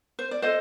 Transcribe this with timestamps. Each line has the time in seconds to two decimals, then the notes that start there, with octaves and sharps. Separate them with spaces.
0.19 C5
0.31 D5
0.42 F4 A4 C5 D#5